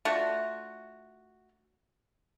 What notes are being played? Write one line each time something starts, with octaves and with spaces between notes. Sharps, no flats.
A3 D4 F4 F#4